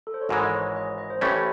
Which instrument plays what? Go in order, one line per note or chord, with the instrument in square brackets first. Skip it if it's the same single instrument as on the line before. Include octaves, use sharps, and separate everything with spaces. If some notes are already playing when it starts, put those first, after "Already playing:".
[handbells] A4
C5
C#5
[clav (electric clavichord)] G#1 G#2 E3 G#3 [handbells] D#5
[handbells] D#5
C#5
D#5
D#5
D#5
C5
[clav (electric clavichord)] A1 A2 E3 A3 C#4 [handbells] C#5